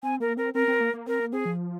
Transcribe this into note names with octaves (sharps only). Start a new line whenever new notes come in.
C4 G#5
A#3 A#4
C4 A#4
C4 A#4
C4
A#3
A#3
C4 A#4
A#3
C4 G#4
F3